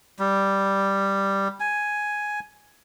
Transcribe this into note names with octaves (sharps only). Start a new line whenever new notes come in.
G3
G#5